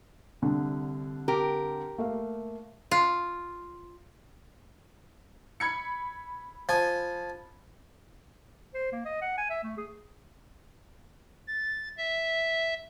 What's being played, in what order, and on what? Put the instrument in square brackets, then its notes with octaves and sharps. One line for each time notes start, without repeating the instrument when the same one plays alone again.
[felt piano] C2 D3
[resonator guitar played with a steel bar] G4 A#4
[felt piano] A3 A#3 F5
[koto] F4
[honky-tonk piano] B5 G#6 C#7
[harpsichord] F3 G#5
[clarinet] C5
A#3
D#5
F#5
G#5
E5
A3
G#4
[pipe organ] A6
E5